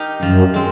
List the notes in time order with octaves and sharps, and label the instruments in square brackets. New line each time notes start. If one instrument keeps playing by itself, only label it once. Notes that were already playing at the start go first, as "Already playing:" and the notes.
Already playing: [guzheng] D#4 G4 A#4
[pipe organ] F#2 [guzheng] F3
[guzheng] G#3 C4